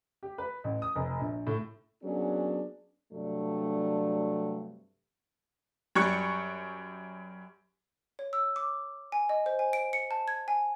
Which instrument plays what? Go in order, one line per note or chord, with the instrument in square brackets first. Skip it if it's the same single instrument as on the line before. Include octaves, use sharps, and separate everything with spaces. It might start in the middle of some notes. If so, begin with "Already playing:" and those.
[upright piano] G4
B4
A1
D#6
F1
A#1
A2
[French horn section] F#3 A#3 B3 C#4 D4 G#4
G2 C3 F#3 A3 D4
[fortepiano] F#2 G3 C#6 F#6
[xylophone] C#5
E6
D6
G#5
D#5
C5
G#5
D7
C#7
A5
G#6
G#5